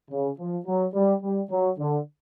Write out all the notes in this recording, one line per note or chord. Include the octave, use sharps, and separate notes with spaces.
C#3
F3
F#3
G3
G3
F#3
D3